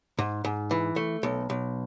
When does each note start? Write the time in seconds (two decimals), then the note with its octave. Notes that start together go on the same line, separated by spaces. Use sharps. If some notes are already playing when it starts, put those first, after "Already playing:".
0.19 G#2
0.45 G#2
0.71 E3
0.96 A3
1.23 B1
1.50 B1